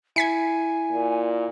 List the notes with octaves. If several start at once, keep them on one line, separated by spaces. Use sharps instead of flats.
E4 G#5 G#6 B6 C#7
A#2